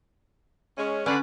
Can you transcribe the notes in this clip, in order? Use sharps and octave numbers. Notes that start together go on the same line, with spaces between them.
G#3 C#4
D3 C#4 D4 B4